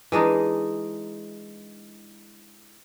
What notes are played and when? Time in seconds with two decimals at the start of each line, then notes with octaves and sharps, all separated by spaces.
0.12 E3 G#3 D4 D#4